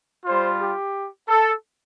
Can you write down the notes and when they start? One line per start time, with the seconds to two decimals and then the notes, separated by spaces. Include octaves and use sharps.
0.25 G3 F4 C5
0.59 G4
1.28 A4